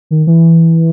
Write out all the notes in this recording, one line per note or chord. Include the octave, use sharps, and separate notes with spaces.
D#3
E3